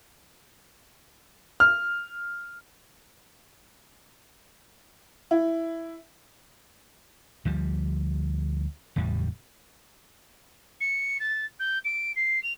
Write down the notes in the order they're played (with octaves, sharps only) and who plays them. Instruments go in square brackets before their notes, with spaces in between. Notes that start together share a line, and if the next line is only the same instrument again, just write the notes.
[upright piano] F6
[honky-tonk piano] E4
[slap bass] D2 F3 G3
F#1 E2 A2 G3
[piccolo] C#7
A6
G6
D7
C7
F7